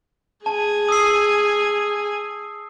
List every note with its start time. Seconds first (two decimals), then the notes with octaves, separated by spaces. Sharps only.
0.46 G#4 G#5 A5
0.89 D#6 E6 C7